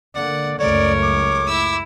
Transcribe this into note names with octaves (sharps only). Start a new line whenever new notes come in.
D3 A#3 D5 F#5
C#2 F#2 A3 A#4 C#5 D5
D6
E4 E6